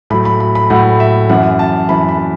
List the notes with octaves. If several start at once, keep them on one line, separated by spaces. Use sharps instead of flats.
A2 F#3 B5
B5
B5
B5
A2 F#3 F#5
E5
F#2 E3 F#5
A5
F#2 E3 B5
B5